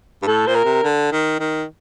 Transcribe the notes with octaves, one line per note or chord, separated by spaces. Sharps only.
G2
A2 A4
A#2 C5
A#4
C3
D3
D#3
D#3